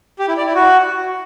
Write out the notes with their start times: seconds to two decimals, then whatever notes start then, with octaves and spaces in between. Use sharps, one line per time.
0.19 G4
0.28 E4
0.37 D5
0.46 E4
0.55 F#4